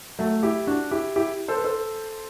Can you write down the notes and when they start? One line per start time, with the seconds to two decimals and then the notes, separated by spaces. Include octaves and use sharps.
0.19 F#3 A3
0.43 E4 G4
0.67 D4 F#4
0.91 E4 G4
1.16 E4 G4
1.48 A4 C5
1.57 B4
1.64 A4 C5